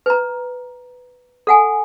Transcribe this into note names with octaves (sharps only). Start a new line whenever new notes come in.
B4 A#5
A4 F#5 G#5